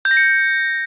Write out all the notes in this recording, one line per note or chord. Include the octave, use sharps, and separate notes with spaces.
G6
A#6
C#7